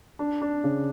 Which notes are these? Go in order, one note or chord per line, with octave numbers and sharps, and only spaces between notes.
D4
D4
C#3